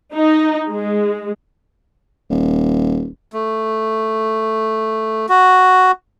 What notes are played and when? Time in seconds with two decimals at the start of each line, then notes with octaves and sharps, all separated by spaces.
0.13 D#4
0.70 G#3
2.30 D#1
3.33 A3
5.29 F#4